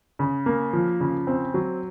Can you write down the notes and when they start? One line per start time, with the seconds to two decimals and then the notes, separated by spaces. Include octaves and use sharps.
0.19 C#3
0.46 A#3
0.73 F3
1.00 C#3
1.27 C4
1.54 F#3